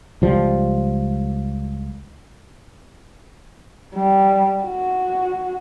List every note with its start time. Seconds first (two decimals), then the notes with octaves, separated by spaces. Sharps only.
0.22 C#2 F3 G3
3.95 G3
4.65 F#4